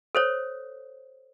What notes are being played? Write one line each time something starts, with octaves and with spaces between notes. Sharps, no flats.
A4 C5 C#5